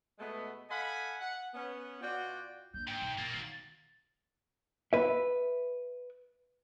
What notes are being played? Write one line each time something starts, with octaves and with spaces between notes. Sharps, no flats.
B2 G#3 A3 B3
A4 D#5 F5 F#5 G#5 B5
F#5
B3 C#4
B2 F4 F#4 D5 F#5 G5
D3 A#3 G6
G#2 G5
B2
A#2 F#3 A#3 A6
D#3
B4 E5